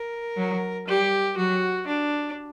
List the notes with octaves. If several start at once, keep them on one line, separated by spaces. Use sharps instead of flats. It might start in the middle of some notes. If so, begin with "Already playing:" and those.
Already playing: A#4
F#3
G3 G4
F#3 F#4
D4